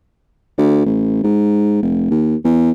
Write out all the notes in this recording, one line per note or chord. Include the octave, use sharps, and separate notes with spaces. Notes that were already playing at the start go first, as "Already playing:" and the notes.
D2
A1
G#2
F1
D#2
E2